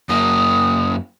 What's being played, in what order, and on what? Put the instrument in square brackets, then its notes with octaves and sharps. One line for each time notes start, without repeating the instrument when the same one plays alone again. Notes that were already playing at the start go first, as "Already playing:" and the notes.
[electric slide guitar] F#2 A#3 [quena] D#6